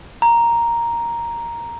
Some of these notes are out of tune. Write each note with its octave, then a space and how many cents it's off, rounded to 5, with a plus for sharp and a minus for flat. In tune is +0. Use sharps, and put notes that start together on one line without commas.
A#5 +5